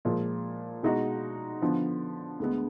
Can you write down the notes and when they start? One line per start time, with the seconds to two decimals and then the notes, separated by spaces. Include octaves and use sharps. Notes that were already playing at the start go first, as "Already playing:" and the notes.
0.05 A#2 F3 G#3
0.83 B2 G#3 D#4 F#4
1.62 D3 F3 B3
2.40 D2 D3 G#3 B3